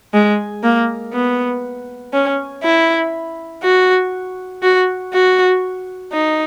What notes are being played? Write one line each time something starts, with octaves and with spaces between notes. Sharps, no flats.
G#3
A#3
B3
C#4
E4
F#4
F#4
F#4
D#4